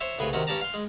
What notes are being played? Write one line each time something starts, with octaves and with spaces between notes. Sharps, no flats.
C5 C#5 E5
C2 A2 C#3 B4 G#5 C6
C3 D#3 C#4 F#4
G2 C#4 G4 D5 A5 A#5
F5 C6
G#3